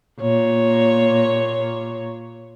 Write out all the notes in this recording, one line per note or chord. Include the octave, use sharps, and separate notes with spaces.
A#2 C#5